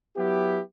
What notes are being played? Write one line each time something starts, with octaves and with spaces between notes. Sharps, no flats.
F#3 B3 E4 G4